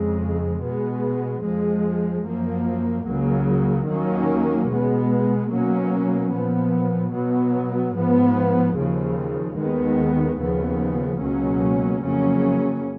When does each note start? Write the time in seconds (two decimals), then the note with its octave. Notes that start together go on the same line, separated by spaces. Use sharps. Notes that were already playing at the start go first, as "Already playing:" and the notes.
Already playing: F2 C#3 G#3
0.62 B2 G#3 B3
1.43 F2 F3 G#3
2.24 F#2 F3 A#3
3.06 C#2 C#3 F#3 A#3
3.88 D#2 D#3 F#3 A#3 C#4
4.69 B2 G#3 B3
5.51 B2 F#3 A#3 C#4
6.31 A#2 F3 B3
7.13 B2 F#3 B3
7.95 G#2 F3 B3
8.76 D#2 C#3 F3
9.57 D#2 D#3 G#3 B3
10.39 D#2 C#3 F3 B3
11.20 C#2 B2 F#3 A#3 C#4
12.03 F2 C#3 F#3 A#3 C#4